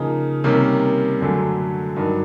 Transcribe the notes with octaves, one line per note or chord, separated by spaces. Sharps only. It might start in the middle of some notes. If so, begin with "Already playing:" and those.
Already playing: C#3 F3 A#3 D#4
C3 D#3 G3 A#3 C#4
F#2 D3 F#3 A3
G2 D#3 F#3